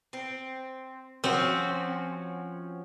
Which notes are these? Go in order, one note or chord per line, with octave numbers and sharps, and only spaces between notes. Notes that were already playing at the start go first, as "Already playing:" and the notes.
C4
F3 C4 C#4 F#4